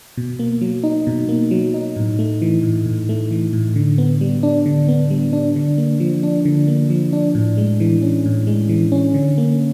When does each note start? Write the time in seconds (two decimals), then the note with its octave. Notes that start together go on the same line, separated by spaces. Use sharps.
0.17 B2
0.39 A#3
0.61 F#3
0.83 D#4
1.07 B2
1.29 A#3
1.51 F#3
1.74 D#4
1.96 A2
2.19 A3
2.42 E3
2.63 A2
2.86 A2
3.09 A3
3.31 E3
3.53 A2
3.76 D3
3.98 B3
4.21 G3
4.43 D4
4.66 D3
4.88 B3
5.10 G3
5.33 D4
5.56 D3
5.78 A#3
6.00 F3
6.23 D4
6.45 D3
6.68 A#3
6.90 F3
7.13 D4
7.35 A2
7.57 G#3
7.80 E3
8.02 C#4
8.26 A2
8.47 G#3
8.69 E3
8.92 C#4
9.14 D3
9.38 A#3